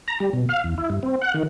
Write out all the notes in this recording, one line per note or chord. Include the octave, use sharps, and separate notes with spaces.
A#5
G3
B2
F5
E2
E4
G2
C4
F#5
D#3